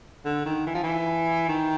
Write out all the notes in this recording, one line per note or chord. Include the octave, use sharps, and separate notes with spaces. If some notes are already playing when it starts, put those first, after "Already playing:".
D3
D#3
E3
F3
E3
D#3